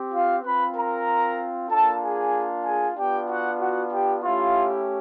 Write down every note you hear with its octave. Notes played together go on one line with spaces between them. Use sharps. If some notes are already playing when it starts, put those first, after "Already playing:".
Already playing: C4 G4
F4 F5
C4 F4 B4 B5
A#4 A#5
A#3 D4 F4 A4 A5
G#4 G#5
G#4 G#5
B3 D4 F4 G4 G5
F#4 F#5
F#4 F#5
G4 G5
A3 C#4 E4 F4 G4 F5